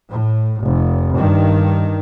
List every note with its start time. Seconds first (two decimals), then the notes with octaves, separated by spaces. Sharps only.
0.11 A2
0.62 F1
1.16 G2 D#3